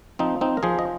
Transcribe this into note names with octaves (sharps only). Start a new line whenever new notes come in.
F3 C4 D#4
C4 D#4
A#4
F3 G#4 C5
D#5